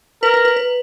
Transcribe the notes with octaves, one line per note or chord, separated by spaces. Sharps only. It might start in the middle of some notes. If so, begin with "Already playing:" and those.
A#4 B4
B4
B4
B4